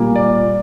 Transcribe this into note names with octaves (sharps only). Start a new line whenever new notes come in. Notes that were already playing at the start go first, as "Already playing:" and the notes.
Already playing: A#2 G3 A#3
D5